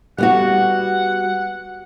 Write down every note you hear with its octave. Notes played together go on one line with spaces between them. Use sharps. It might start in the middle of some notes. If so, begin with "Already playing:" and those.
G3 B3 F#4 F#5